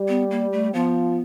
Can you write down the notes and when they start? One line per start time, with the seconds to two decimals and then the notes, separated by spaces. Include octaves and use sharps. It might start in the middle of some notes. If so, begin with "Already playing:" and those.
Already playing: G3
0.08 B3
0.31 A#3
0.53 A3
0.74 F3 B3